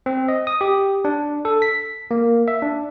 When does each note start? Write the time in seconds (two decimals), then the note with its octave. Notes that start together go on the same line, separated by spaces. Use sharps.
0.06 C4
0.28 D#5
0.47 D#6
0.61 G4
1.05 D4
1.45 A4
1.62 B6
2.11 A#3
2.48 E5
2.62 D4